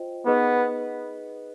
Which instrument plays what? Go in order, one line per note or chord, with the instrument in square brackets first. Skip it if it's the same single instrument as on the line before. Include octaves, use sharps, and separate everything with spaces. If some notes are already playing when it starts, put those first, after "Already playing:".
Already playing: [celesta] F4 C5 D#5 G5
[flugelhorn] B3 [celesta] D#4 G#4 B4 D#5